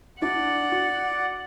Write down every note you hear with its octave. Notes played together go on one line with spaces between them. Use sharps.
D4 E4 F#4 D5 F#5
F#4